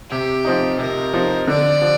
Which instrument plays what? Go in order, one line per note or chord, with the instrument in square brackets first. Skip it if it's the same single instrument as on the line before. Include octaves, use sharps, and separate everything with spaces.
[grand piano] C3 [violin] G4
[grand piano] F3 C4 D#4
[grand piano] C3 [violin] A#4
[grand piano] F3 C4 D#4
[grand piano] D3 [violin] D5
[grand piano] F3